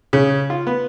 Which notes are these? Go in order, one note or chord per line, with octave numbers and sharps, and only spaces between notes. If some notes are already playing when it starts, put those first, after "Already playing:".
C#3
F4
B3